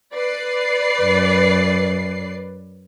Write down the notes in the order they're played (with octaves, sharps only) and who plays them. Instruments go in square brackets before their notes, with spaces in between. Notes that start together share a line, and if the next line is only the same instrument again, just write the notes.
[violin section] B4 D5 C7
[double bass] F#2